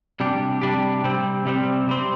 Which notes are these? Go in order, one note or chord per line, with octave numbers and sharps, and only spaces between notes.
C3 G3 D4 G4
C3 G3 D4 G4
C3 G3 C4
C3 G3 C4
C3 G3 C4